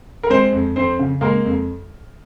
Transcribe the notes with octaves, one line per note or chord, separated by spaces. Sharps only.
A#4
G#3 C4 C5
F2
F2 C4 C5
C#3
G#3 A#3 A#4
F2